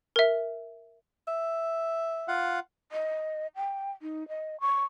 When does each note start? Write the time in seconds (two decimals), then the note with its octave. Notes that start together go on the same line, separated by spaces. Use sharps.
0.16 A#4 E5
1.28 E5
2.28 F4 F5 F#5
2.92 D#5
3.56 G5
4.02 D#4
4.28 D#5
4.60 C#6